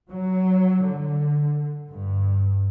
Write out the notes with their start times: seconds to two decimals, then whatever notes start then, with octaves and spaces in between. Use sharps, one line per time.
0.11 F#3
0.88 D3
1.89 G2